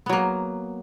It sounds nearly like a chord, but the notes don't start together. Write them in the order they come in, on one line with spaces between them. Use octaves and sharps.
B3 F#3 A#3